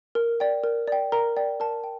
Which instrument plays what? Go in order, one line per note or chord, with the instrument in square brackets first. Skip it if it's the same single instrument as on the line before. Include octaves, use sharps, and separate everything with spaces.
[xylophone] A#4
D5 G5
A#4
D5 G5
A#4 A#5
D5 G5
A#4 A5
G5